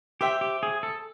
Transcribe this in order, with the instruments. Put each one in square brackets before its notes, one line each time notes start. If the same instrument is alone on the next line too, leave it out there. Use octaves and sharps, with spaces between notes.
[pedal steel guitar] G4 [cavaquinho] C5 E5 G5
[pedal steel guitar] G4
G#4
A4